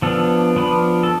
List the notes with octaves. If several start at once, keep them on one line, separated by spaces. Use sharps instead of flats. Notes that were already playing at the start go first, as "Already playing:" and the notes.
F3 B3 D4 A4
F3 B3 D4 B4
A4